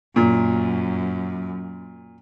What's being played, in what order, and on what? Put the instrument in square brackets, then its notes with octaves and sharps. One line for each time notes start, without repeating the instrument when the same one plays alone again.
[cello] F#2 [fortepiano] A#2